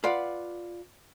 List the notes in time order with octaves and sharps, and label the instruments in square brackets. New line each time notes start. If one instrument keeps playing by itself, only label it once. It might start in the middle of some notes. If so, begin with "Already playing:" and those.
[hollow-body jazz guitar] F4 B4 D5 F5 F#5